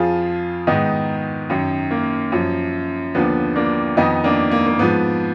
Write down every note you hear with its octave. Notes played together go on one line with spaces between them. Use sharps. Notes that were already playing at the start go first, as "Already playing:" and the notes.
Already playing: F2 F3 F4 G#4
G#2 D#3 B3 D#4
F#2 D#3
A#3
F#2 F3
D#2 D3 F3 B3
A#3 D4
F2 D#3 B3 D#4
A#3 D4
A#3
A#3
G#2 F3 B3